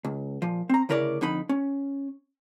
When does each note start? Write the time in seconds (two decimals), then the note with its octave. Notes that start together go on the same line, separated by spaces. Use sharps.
0.05 C#2
0.42 A#2 F3
0.69 C4 A#5
0.89 D2 C#3 E4 A#4 C#5 D5
1.21 F2 D3 D#4 B5
1.49 C#4